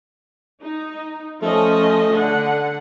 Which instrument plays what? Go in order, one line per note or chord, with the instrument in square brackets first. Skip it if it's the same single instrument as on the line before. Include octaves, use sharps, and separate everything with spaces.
[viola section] D#4
[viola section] F3 C#4 D#5 [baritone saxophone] A3
[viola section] D3 F#5